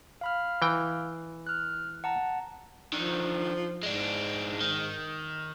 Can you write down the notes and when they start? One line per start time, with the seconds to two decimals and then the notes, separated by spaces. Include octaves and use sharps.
0.21 F5 B5 F6
0.62 E3 G5
1.47 F6 F#6
2.04 F#5 A5 A#5
2.92 D3 D#3 F3
3.83 G#2 G#3 D4
4.61 D#3